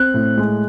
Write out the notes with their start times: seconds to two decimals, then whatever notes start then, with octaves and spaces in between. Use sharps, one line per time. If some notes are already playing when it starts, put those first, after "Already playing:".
Already playing: C4 F#6
0.14 A2
0.38 G#3